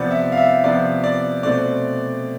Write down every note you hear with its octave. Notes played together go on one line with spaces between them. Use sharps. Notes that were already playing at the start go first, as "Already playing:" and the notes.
Already playing: C3 F3 B3 D5
E5
F5
E5
C3 F3 B3 D5
D5
B2 A3 C4 D5